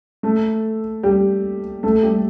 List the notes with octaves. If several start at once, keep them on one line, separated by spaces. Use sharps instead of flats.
A3 A4
G3 G4
A3 A4
G3 G4